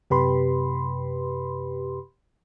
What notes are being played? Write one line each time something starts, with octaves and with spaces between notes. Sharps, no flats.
F#2 C3 G4 B4 B5 C6